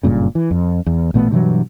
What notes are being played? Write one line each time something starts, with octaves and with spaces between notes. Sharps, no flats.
F#1 G2 A#2 C#3
E3
F2
E2
A1 A#2 A3 B3
G2 B2 E3 F#3